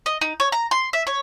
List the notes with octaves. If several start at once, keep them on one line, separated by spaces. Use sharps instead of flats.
D#5
D#4
C#5
A#5
C6
E5
C#5